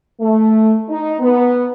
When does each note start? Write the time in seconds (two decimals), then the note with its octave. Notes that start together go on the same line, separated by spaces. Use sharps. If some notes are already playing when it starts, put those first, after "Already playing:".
0.21 A3
0.89 D#4
1.20 B3